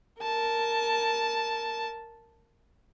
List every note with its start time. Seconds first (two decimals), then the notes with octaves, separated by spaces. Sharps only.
0.22 A#4 A5